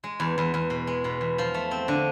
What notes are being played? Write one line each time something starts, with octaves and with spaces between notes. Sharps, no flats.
G#3
E2
E2
E2
B2
G#3
B2
E2
F3
A3
C4
D3